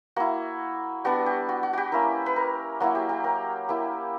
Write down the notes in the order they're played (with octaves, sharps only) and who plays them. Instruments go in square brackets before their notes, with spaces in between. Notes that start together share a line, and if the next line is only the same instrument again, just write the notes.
[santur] A#3 E4 F#4
G3 B3 D4 F#4
G4
F#4
F#4
F#4 G4
A#3 C#4 E4 A#4
B4
A#4
F#3 A#3 E4 F#4
G4
G4
A#4
A#3 E4 G4